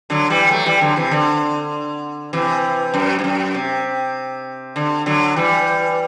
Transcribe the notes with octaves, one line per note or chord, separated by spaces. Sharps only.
D3 F#3
E3 G3
F#3 A3
E3 G3
D3 F#3
C3 E3
D3
C3 E3
F#2
G2
F#2
C3
D3
D3 F#3
E3 G3